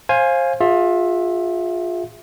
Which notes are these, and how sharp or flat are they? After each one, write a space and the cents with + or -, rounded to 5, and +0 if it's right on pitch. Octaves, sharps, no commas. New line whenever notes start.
C5 +30 F5 +0 G#5 +0
F4 +25 G#4 -10 E5 +0